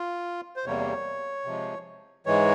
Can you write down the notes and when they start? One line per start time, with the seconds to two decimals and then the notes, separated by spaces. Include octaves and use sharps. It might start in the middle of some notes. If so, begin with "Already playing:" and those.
Already playing: F4
0.56 C5
0.66 E2 C3 G3 A#3 C#5
1.46 C3 F3 G#3
2.26 G#2 E3 G#3 C#5